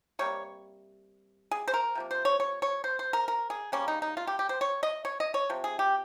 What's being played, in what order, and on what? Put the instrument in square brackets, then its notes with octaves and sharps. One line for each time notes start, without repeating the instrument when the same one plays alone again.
[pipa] C3 G3 A#3 C#5
G#4
C5
A#4
C3 F3 A#3
C5
C#5
C#5
C#5
C5
C5
A#4
A#4
G#4
C#3 G3 A#3 C#4
D#4
D#4
F4
G4
G4
C5
C#5
D#5
C#5
D#5
C#5
C3 F3
G#4
G4